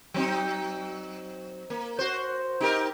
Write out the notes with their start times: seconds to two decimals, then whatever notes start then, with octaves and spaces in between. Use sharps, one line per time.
0.14 F#3 C4 D#4
1.70 A#3
1.99 F#4 C5
2.61 D#4 G4 A#4